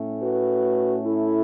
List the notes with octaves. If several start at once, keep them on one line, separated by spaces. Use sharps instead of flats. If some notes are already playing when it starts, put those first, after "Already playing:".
Already playing: A2 A3 C#4
F#4 B4
E4 A4